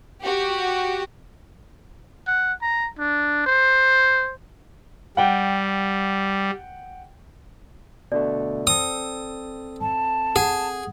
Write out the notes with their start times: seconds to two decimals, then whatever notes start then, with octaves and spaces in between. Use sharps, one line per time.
0.21 F#4 G4
2.27 F#5
2.62 A#5
2.98 D4
3.46 C5
5.17 G3 F#5 G5
8.12 B2 D3 A3 D5
8.67 C4 A4 D#6
9.81 A5
10.36 G#4 F#5